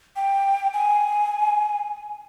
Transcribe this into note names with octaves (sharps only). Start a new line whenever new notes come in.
G5
G#5